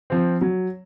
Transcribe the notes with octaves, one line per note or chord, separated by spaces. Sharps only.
F3 C4
F#3